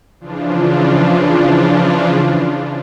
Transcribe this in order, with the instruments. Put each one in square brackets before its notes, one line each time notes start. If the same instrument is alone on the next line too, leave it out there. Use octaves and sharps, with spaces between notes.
[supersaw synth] C#3 E3 F3 D4 F4